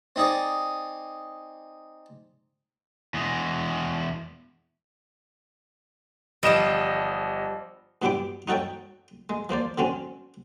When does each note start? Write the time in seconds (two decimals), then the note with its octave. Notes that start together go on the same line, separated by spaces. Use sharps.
0.16 C4 D#4 G#4 D5
3.14 E2 G#3
6.43 G1 F3 G3 D#5 E7
8.02 G2 F#3 D4 E4 G4 D6
8.48 D#4 F#4 A4 C#5 G5
9.30 G#3
9.49 F3 A#3 C5 D5
9.78 D3 F#3 C4 C#4